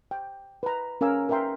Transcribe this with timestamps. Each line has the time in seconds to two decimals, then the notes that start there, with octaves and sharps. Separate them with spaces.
0.11 G5
0.63 B4 A#5
1.01 C#4 A#4 F5 G#5 E6
1.29 A#4 B4 E5 G5 C6